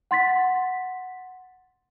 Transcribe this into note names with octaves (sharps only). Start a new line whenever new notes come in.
F#5 C6 A6 B6